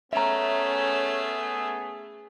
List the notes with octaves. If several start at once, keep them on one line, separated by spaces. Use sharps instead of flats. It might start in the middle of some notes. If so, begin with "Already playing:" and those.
A3 B3 C#4 G#4 E5 A#5